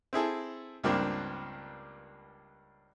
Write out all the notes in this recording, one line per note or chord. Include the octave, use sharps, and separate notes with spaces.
C4 E4 G#4 A4
C#2 G2 A#3 C4 D4